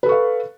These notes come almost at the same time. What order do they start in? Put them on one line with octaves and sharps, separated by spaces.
B4 A4 C#6 F5